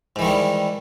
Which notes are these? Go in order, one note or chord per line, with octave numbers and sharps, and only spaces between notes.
G#2 D#3 E3 G3 G#3